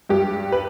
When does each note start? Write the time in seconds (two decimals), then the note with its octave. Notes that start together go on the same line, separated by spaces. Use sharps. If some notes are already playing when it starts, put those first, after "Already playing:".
0.09 G2 G4
0.52 B4